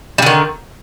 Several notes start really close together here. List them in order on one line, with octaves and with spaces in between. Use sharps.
G3 D3 D#3